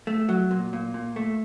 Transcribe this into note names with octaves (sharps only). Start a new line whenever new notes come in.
A3
F#3
A#2
A#2
A#2
A3